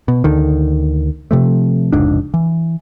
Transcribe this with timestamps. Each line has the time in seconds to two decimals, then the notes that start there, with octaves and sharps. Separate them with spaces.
0.08 B2
0.24 D2 D3 D#3
1.31 C3 F3 A3
1.92 F1 C#2 G#2 D4
2.34 E3